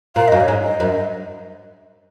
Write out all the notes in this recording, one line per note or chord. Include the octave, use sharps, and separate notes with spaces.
A#2 F5
F#2 D#5
C#5
G#2
D#5
F#2